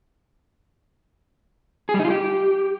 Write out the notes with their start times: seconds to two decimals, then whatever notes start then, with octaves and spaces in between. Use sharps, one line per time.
1.89 G#4
1.94 G3
1.99 D#4
2.05 F4
2.10 G4